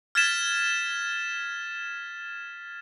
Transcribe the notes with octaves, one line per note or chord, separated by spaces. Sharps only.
F6 G#6 A6 B6 E7